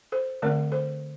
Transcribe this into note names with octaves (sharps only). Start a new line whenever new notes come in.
A4 C5
D3 A3 C4 A#4 D5
A4 C5